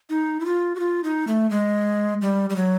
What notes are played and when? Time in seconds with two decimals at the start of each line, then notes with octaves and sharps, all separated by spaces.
0.10 D#4
0.40 E4
0.46 F4
0.75 F#4
0.80 F4
1.04 D#4
1.27 A3
1.50 G#3
2.22 G3
2.50 G3
2.56 F#3